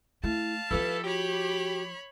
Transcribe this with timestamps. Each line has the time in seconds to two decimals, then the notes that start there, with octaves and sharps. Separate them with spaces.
0.24 A3 E4 F5 A5
0.71 F3 E4 F4 G4 A4 B4
1.04 F#4 G4 C#5 B5